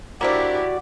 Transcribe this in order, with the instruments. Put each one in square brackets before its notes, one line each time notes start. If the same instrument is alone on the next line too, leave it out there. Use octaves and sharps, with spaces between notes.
[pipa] A#3 C4 D4 [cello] E4 G4 [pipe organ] F#4 D5